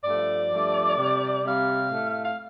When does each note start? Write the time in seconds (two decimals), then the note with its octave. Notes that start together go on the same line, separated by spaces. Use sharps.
0.04 G2 F3 A3 D5
0.51 G2 F3 A3
0.97 C3 G3
1.44 C3 G3 F5
1.90 A2 A3
2.25 F5